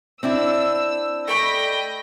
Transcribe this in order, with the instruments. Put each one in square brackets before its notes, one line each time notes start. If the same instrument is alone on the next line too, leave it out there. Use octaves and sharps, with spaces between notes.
[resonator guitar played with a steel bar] C4 D4 E4 [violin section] E6
[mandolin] A3 D5 B5 [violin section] D#5 A#6 [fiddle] G5